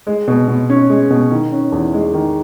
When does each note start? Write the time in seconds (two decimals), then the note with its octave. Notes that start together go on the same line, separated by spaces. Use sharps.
0.07 G#3
0.28 B2
0.48 B2
0.69 C#4
0.89 G#3
1.10 B2
1.31 D#3
1.52 C#4
1.72 E2
1.93 G#3
2.14 D#3